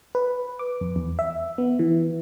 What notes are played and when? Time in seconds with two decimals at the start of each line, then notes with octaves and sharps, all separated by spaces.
0.15 B4
0.59 D6
0.81 F2
0.96 E2
1.19 E5
1.58 B3
1.79 E3